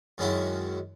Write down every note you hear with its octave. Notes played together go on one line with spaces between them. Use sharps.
F#2 D#3 G#3 C#4 E4 F#4